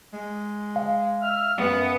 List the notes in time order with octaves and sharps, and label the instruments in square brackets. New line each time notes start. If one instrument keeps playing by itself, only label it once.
[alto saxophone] G#3
[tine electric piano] F5
[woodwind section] E5 E6 F6
[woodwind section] F#2 [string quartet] B3